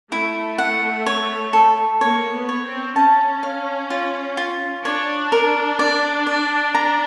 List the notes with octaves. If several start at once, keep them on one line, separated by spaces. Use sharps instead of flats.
A3 E4
F#5
C#5
A4
A#3 C#5
B3
C#5
C4
C#4 A5
F5
F4
F4
D4 C#5
A#4
D5
D5
A#5